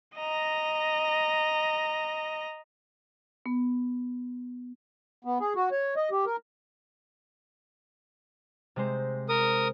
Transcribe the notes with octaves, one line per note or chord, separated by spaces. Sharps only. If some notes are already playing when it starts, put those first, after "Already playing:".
D#5 A#5
B3
B3
G#4
F#4
C#5
D#5
G4
A#4
C3 G#3 C5
A#4 D#6